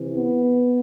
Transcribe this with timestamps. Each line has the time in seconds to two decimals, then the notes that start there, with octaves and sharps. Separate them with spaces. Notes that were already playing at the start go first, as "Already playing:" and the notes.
Already playing: C3 E3
0.14 B3